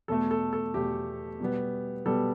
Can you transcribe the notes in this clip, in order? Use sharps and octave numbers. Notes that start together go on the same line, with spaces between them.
E2 B2 A3 A4
A4
A4
E2 B2 A3 G4
B2 G3 B3
B2 G3 B3 A4